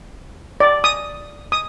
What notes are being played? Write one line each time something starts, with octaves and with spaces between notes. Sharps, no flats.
D5
D#6
D#6